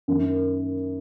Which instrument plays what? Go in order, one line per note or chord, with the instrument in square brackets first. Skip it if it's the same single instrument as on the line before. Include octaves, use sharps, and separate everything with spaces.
[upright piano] F#2 D#3 A#3